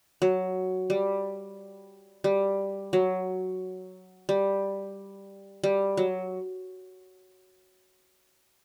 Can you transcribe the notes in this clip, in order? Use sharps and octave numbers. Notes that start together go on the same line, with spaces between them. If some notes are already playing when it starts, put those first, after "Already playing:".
F#3
G3
G3
F#3
G3
G3
F#3